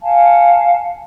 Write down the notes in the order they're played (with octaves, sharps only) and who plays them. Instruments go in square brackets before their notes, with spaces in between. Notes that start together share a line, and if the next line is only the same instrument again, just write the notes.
[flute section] F5 F#5 G#5 A5